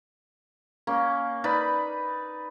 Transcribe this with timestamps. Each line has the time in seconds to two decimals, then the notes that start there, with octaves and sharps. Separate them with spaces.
0.87 A#3 C#4
1.44 D#4 B4 D5 B5